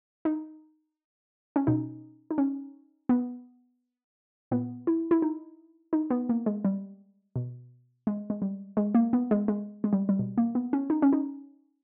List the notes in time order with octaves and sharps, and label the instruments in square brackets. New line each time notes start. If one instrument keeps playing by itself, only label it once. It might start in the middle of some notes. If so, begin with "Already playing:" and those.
[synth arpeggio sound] D#4
C#4
B2 D#4
D#4
C#4
B3
A#2 B3
E4
E4
D#4
D#4
B3
A#3
G#3
G3
B2
G#3
G#3
G3
G#3
A#3
B3
G#3
G#3
G#3
G3
G3
B2
A#3
B3
C#4
D#4
C#4
D#4